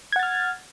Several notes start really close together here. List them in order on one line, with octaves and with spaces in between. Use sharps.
G#6 F#5 A6 F6